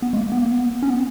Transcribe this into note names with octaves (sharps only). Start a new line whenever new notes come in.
B3
G#3
A#3
B3
A#3
B3
C#4
B3